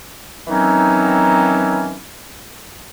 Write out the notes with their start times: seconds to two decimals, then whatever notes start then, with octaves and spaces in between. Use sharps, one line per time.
0.48 D#3 E3 F#3 C4 C#4 D#4